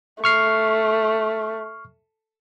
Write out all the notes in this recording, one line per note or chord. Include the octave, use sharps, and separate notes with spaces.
A3 C#6 F6 C7